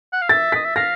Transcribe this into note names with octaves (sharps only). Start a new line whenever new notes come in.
F#5
F5
E5 A6
D#5 B6
E5
F5 A#6